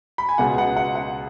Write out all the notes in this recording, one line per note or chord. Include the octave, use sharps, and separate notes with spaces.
B5
G#5
C#2 B2 B3 F#5
F#5
F#5
F#5